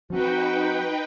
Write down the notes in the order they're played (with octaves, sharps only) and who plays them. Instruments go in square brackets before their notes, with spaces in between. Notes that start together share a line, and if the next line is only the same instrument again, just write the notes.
[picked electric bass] F3 C4 [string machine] D#4 B4 G5 [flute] F#4